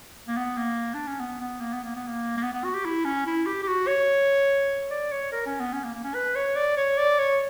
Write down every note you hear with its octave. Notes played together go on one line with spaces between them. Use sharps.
A#3
B3
A#3
D4
C#4
B3
B3
A#3
B3
A#3
B3
A#3
A#3
B3
B3
F#4
G4
E4
C#4
E4
G4
G4
F#4
C#5
D5
C#5
A#4
C#4
B3
C#4
A#3
A#3
C#4
B4
C#5
D5
C#5
D5
C#5